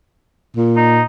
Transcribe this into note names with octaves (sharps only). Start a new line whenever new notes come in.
A#2
D#4